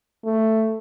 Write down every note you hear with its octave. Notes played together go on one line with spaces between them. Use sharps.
A3